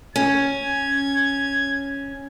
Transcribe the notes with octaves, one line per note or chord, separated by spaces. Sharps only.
C#4 G#6